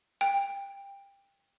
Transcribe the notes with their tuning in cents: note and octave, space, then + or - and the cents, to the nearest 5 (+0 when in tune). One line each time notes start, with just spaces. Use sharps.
G5 +20